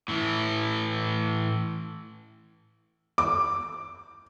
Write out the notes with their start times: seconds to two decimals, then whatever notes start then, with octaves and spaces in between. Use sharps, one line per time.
0.08 A2 E3
3.18 D6